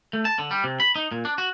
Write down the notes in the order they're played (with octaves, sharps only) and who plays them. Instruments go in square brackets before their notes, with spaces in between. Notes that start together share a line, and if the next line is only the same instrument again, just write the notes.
[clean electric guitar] A3
A5
D3
G3
C3
B5
D#4
A#2
D4
F#4